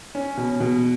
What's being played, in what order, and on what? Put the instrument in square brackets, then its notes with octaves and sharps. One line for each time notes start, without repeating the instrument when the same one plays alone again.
[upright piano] C#4
B2
B2